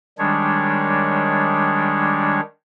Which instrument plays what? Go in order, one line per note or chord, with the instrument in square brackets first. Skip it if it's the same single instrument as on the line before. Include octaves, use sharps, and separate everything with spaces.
[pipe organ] D#3 G3 G#3 D4 C#5